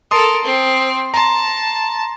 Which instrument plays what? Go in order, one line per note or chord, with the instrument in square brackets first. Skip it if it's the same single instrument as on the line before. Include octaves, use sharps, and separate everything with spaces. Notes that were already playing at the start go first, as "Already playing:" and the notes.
[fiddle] A4 A#4 [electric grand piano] A5 C6 D#6
[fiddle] C4
[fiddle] A5 [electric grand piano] A#5 C6